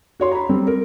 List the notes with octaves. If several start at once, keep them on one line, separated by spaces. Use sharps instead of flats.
F#4 C#5 C6
A#5 B5
G3 C4
A#4